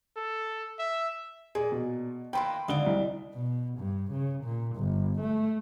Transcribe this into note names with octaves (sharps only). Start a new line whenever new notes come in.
A4
E5
A#2 G#4
B2
D#3 E3 A#3 G5 B5 C6
G#1 D3 D5 D#5 G7
C2
B2
G2
C#3
A#2
G1
A3